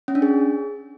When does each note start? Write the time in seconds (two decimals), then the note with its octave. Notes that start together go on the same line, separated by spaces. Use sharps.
0.08 C#4
0.15 D4
0.22 G#4